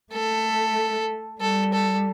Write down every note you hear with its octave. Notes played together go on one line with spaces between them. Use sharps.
A3 A4
G3 A4
A4